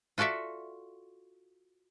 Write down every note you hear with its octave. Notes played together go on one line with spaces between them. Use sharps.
F4 F#4 A4 D5 E5